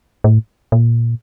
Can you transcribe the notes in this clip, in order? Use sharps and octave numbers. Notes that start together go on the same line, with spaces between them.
A2
A#2